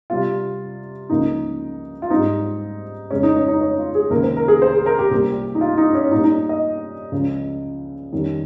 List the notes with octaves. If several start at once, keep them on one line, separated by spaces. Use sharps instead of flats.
C3 G3 C4 F4
C#2 C#3 F3 A#3 D#4
F4
G#2 G3 C4 D#4
F2 C#3 G#3 C#4
D#4
C#4
D#4
C#5
F4
G#4
C#2 C3 D#3 A#3 C#4 A#4
C5
A#4
G#4
C5
G#4
A#4
G4
C2 A#2 G3
D#4
F4
D#4
C#4
A#2 G3 C#4 D#4
D#4
D#5
C#2 C#3 F3
F2 D#3 G3 C#4